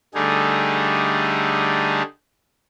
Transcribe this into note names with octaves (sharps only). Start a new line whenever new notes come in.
D3 G3 A3 D#4 G#4